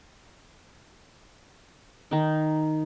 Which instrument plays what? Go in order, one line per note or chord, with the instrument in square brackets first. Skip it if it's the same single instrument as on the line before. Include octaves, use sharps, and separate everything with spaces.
[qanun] D#3 D#4